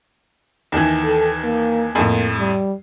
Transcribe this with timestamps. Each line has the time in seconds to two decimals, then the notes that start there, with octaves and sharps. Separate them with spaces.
0.72 D#2 D#3 E3
1.04 A4
1.44 A#3
1.95 F2 A2 A#3
2.38 G3